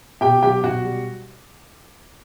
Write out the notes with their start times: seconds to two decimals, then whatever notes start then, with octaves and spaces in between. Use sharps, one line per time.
0.21 B2 G4 G5
0.43 F#3 G4 G5
0.64 B2 F#4 F#5
0.84 G3